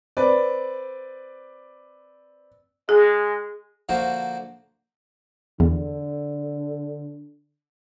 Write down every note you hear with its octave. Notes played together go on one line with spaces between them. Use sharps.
C4 B4 D5
G#3 G#4
D3 F3 A#3 F#4 C5
E2 D3